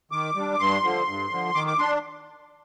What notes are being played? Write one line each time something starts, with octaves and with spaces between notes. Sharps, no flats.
D#3 D6
G3 D4
G2 C6
D3 F3
G2
D3 F3
D#3 D6
D6
D4 C6